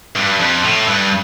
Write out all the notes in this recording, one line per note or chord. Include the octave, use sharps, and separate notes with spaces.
G2
F2
A2
G2